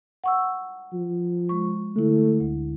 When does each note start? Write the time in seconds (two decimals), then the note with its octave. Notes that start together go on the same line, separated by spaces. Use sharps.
0.24 F#5 C#6 E6
0.93 F3
1.49 G#3 C#6
1.96 D3 A3 E4
2.40 D2